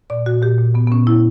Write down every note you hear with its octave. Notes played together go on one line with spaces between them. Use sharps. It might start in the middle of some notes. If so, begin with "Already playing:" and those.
A#2 D5
A#2 F#4
A#2 G4
A#2
A#2 B3
B3
A#2 C#4
A#2 E4